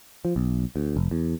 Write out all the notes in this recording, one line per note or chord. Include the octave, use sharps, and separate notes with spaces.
F3
B1
D2
F1
E2